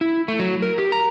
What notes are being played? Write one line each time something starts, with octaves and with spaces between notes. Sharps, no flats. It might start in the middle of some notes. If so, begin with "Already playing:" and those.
E4
A3
F#3
A#4
G4
A#5